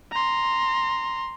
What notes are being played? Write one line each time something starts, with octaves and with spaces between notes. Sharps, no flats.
A#5 C6